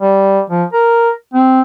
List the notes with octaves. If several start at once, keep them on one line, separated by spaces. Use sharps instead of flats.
G3
F3
A#4
C4